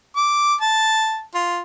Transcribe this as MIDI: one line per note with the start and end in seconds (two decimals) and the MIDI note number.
0.16 0.54 86
0.61 1.22 81
1.34 1.60 65